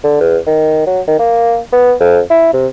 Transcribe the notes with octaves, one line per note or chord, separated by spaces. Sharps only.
D3
E2
D#3
F#3
D#3
A#3
B3
F2
E4
C3